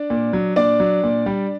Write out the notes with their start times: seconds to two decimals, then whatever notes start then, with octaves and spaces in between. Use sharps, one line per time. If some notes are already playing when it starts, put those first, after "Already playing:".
Already playing: D4 D5
0.10 A#2
0.33 F#3
0.56 A#2 D4 D5
0.80 F#3
1.04 A#2
1.26 G3